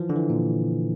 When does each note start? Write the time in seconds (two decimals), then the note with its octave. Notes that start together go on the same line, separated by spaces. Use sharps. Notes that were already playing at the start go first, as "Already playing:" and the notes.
Already playing: E3 F3
0.09 D3
0.16 E3
0.30 A#2